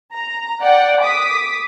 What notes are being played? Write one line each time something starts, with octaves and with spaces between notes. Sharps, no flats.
A#5
D5 F#5 G5
D6 D#6 B6